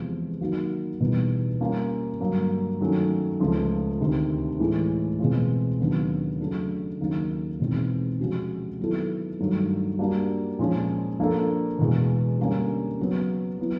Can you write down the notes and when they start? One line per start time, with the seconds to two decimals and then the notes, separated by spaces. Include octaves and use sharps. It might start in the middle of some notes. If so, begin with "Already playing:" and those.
Already playing: E2 C3 F3 G#3 B3
0.41 D#3 F#3 A#3 D#4 F#4
1.00 E2 B2 G3 B3 D#4
1.60 G3 A#3 C#4 F4
2.20 G2 D3 F#3 A#3
2.80 D#3 F#3 A3 C#4
3.40 C#2 C#3 F3 A3
4.00 D2 C3 D#3
4.59 A2 E3 G#3
5.19 E2 B2 G#3 C4 F4
5.80 D#2 C#3 F#3 B3 D4
6.40 C#3 F#3 A3 D4
7.00 D#2 C#3 F#3 A#3 D#4
7.60 E2 B2 G#3 C4 D#4
8.20 C3 F3 G#3 C#4 F#4
8.80 D#3 F#3 B3 E4 A4
9.39 G2 D#3 F#3 A3
9.99 G3 A#3 D4 F#4
10.59 A#2 F3 G#3 C#4 F4
11.19 F3 A#3 D4 F4 A4
11.79 E2 B2 G#3
12.39 D3 G3 A#3 C#4
12.99 C#3 F#3 B3
13.58 F#3 B3 E4